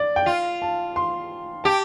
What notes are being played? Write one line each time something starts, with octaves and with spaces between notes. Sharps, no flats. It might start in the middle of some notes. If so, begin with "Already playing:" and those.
Already playing: D5
G5
F4 F5
A5
C6
G4 A5